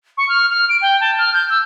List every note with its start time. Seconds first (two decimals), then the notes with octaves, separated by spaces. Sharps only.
0.18 C#6
0.29 F6
0.49 F6
0.69 D7
0.81 G5
1.01 A5
1.18 F6
1.33 G6
1.50 E6